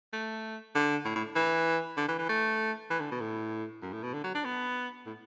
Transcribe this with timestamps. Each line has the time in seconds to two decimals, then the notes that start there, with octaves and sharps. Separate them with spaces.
0.13 A3
0.75 D3
1.05 A2
1.16 A2
1.35 E3
1.97 D3
2.08 E3
2.18 E3
2.29 A3
2.90 E3
3.00 D3
3.11 B2
3.21 A2
3.82 F#2
3.93 A2
4.03 B2
4.13 D3
4.24 F#3
4.34 D4
4.44 B3
5.06 A2